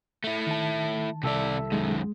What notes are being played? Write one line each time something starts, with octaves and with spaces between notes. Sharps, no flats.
A3 E4
D#3 A5
C2 C3 A4 D5 E5
F#2 D#3 G#3